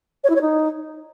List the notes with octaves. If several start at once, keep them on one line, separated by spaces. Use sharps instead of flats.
C#5
E4
C#5
D#4